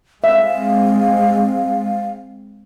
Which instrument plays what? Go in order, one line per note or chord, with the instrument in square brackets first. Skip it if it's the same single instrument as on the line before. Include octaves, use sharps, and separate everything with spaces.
[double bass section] G#3 C4 [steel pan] E5 [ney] F5